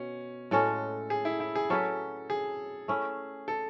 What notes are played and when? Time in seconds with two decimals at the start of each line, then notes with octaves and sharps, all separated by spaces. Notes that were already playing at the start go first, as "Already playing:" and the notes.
Already playing: B2 C#4
0.51 A2 G#3 C#4 F#4 A4
1.10 G#4
1.25 E4
1.40 E4
1.55 G#4
1.70 F#3 C#4 E4 A4 B4
2.30 G#4
2.88 A3 C#4 E4
3.48 A4